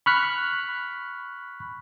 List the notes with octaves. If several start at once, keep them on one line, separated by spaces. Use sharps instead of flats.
B5 C#6 F6 F#6 B6